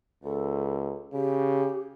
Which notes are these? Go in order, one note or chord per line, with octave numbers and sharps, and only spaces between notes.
C#2 A4
C#3 G4